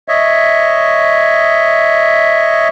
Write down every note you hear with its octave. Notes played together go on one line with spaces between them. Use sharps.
C#5 D#5 E5